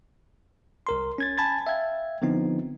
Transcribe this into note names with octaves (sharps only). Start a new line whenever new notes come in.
C2 A#4 C6
C#4 G#6 A6
G#5 A5 B5 G#6 A6
E5 F5 G5 G#6
D3 F3 B3 C4 D#4